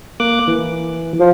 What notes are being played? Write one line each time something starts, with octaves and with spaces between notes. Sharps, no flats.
A#3 D6 F#6
E3
F3